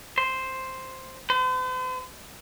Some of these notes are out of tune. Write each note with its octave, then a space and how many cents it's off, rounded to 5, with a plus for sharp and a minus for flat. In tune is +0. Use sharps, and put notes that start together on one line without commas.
C5 +0
C5 -45